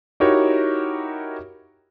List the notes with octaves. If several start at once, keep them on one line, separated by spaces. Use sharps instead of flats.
D#4 E4 F#4 G4 A#4 C#5